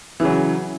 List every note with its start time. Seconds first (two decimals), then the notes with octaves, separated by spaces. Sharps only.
0.20 E3
0.22 C#3
0.25 F#3